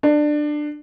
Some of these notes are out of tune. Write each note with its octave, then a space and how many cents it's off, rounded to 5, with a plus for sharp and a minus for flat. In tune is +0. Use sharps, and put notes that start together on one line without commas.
D4 +20